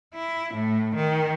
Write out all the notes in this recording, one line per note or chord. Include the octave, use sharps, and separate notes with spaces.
E4
A2
D#3